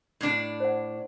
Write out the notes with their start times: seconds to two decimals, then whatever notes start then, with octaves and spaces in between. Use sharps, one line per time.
0.21 A2 D4
0.60 C5 F#5